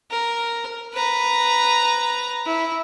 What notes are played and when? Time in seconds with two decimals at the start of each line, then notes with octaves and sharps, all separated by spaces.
0.11 A#4
0.94 B4 A#5
2.46 E4